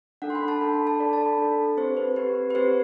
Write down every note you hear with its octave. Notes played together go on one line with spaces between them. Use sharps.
D4 A4 F#5
C6
B5
A5
D4 A4 B5
B5
A5
D4 A4 D5
A5
B5
D4 A4
C4 G4 C5
B4
C4 G4 B4
B4
C4 G4 C5